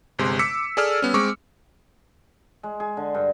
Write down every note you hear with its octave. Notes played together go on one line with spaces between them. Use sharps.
G1 C3 G#3 C6
D6 E6 B6 C#7
G#4 A4 D5 E6 F6
G3 B3 C#4
G#3 C4 C#6 D6 C#7
G#3
G#4
D3
G2